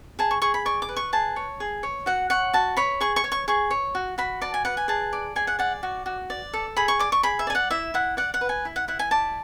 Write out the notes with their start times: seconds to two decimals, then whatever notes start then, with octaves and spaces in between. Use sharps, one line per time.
0.19 G#4 A5
0.31 C#6
0.42 G#4 C#6
0.54 B5
0.65 D5 C#6
0.82 D6
0.89 B4
0.96 C#6
1.13 G#4 A5
1.36 C#5
1.60 G#4
1.83 C#5
2.06 F#4 F#5
2.30 C#5 F#5
2.53 F#4 A5
2.77 C#5 B5
3.01 G#4 C#6
3.16 C#6
3.24 C#5
3.32 C#6
3.48 G#4 C#6
3.71 C#5
3.95 F#4
4.18 F#4 B5
4.41 D5 A5
4.54 G#5
4.65 B4 F#5
4.77 G#5
4.88 G#4 A5
5.13 D5
5.36 G#4 G#5
5.47 F#5
5.59 D5 F#5
5.83 F#4
6.06 F#4
6.30 D5
6.53 A4
6.77 G#4 B5
6.88 C#6
6.99 D5 D6
7.12 C#6
7.23 G#4 B5
7.39 E5
7.47 D5 G#5
7.55 F#5
7.70 E4 E5
7.94 E4 F#5
8.17 D5 F#5
8.34 F#5
8.41 B4
8.49 G#5
8.65 E4
8.76 F#5
8.88 E4 F#5
8.99 G#5
9.11 D5 A5